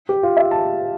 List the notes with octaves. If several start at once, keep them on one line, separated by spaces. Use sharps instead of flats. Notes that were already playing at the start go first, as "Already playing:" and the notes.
G4
F4
E5
A5